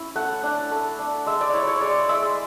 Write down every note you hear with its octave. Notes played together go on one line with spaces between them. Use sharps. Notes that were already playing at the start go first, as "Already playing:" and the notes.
Already playing: C#4 E4
A3 F#5
D4
A3
D4
G#3 E5
D5
E4 C#5
C#5
G#3 D5
G#3 E5